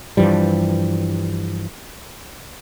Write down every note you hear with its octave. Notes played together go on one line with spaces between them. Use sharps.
G2 E3 F3 G3